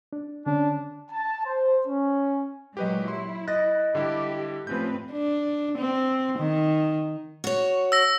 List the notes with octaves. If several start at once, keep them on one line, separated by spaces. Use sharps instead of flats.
D4
D3 C#4 D4
A5
C5
C#4
A#2 F#3 G#3 G4 B4 D#5
E4 C6
D#5 F#6 A6 A#6
D3 G3 E4 G4
A2 F3 C4 C#4 B4 G6
D4
C4
D#3
F#4 C#5
E6 A#6